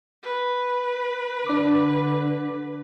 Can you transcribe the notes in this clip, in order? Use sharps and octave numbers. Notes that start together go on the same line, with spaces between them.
B4
D3 D4 D6